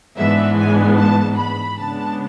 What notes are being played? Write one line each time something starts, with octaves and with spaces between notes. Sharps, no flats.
G#2 E3 G#3 B3 D4 E5
G#5
A5
B5
C#3 G#3 B3 D4 A5